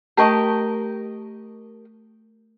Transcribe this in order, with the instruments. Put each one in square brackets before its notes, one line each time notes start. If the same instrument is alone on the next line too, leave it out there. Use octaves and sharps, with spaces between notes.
[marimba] A3 [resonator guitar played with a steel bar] G4 A#4 D#5 [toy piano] A5 C#6